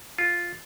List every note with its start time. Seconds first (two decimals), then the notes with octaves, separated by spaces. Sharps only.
0.18 F4